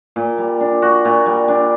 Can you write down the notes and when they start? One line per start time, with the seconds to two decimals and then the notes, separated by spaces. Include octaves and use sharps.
0.16 A#2
0.38 G3
0.61 D4
0.82 F#4
1.05 A#2
1.26 G3
1.48 D4